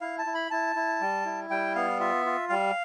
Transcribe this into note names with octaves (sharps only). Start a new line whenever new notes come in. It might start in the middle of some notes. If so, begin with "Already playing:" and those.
E4 F5
A5
E4
B5
E4 A5
E4
G3
E4
G3 G5
B3 F5
F4 E5
F4
G3 F5